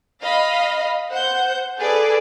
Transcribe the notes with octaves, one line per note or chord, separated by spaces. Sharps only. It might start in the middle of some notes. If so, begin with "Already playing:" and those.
D#5 F5 B5
C5 F#5 G6
G#4 A4 B4 D5